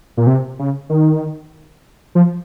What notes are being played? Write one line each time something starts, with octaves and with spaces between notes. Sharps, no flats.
A#2
C3
C#3
D#3
F3